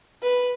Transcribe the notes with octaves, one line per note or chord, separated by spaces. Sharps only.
B4